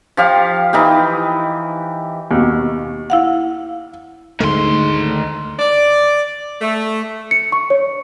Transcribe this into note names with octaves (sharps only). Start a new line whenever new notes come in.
F3 G4 F5
E3 D#4 G4
D#2 B2
E4 F5 F#5
D2 G#2 D3 D#3 A3 C6
D5
A3
C#7
C#6
C#5